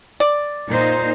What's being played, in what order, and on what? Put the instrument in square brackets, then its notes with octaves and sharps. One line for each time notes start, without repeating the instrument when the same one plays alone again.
[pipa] D5
[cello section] A#2 D#4 C5